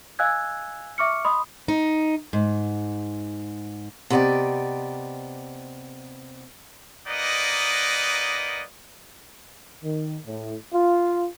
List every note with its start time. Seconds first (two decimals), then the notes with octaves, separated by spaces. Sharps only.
0.19 D#5 F5 G#5 E6 F#6 G#6
0.98 E5 C#6 D6 F6 C#7
1.25 D#5 B5 C6 D#6
1.68 D#4
2.33 G#2
4.10 C3 B3 B4 D5 D#5 G5
7.07 A#3 D#4 B4 D5 D#5 F#5
9.83 D#3
10.25 A2
10.73 F4